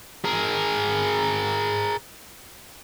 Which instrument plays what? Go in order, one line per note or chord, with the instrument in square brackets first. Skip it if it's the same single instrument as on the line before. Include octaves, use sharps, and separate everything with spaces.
[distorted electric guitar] G#4 A#4